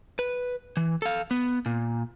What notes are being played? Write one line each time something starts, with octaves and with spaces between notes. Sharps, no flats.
B4
E3
A4 F5
B3
A#2